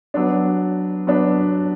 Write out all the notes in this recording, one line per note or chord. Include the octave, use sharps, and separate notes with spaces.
F#3 B3 D4
F#3 B3 D4